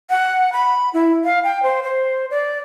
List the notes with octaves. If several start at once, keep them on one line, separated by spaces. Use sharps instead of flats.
F#5
B5
E4
F5
G5
C5
C5
D5